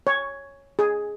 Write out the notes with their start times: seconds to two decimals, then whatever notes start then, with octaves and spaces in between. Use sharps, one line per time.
0.07 C#5
0.79 G#4